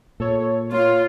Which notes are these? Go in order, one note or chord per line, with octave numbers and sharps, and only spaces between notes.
A#2 A4 C#5
A#3 F4 C#5